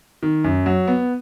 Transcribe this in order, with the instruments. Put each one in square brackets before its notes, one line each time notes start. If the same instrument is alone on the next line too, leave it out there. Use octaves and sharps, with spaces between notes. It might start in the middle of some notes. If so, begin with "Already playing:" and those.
[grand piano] D#3
F#2
F#3
B3